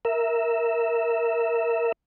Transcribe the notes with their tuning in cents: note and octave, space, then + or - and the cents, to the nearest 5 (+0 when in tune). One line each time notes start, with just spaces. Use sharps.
A#4 +0 E5 +0